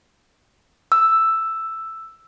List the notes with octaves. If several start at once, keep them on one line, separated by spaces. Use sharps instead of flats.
E6